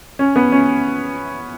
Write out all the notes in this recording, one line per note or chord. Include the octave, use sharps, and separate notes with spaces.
C#4
B3
C#4